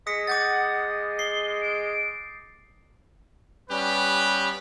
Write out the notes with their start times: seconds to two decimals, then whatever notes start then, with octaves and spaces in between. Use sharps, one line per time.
0.07 G#3 D#6 A#6 B6 C#7
0.27 F#5 D6 G6 A6
1.19 C7 G7
1.61 D7
3.70 G3 B3 C#4 G4 B4